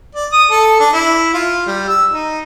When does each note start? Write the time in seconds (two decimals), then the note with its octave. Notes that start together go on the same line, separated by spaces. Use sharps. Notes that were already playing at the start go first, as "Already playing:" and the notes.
0.15 D5
0.32 D#6
0.50 A4
0.80 D4
0.93 E4
1.34 F4
1.66 G3
1.88 E6
2.11 D#4